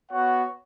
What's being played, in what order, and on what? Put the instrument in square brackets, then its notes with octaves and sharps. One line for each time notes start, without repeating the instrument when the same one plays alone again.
[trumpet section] B3 F#4 C#5 F#5